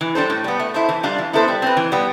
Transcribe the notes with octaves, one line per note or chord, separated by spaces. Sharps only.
E3
G3 D4 A4 C5
A2
G3 B3
A3
E4 A4 C5
E3
G3 D4 F4
E3
B3 E4 A4 C5
G3
C4 G4 B4
E3
G3 B3